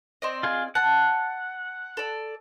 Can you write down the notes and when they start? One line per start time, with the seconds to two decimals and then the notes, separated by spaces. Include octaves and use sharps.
0.22 C4 D5 D#5
0.43 F4 G#4
0.75 F#5 A5
1.97 A4 D5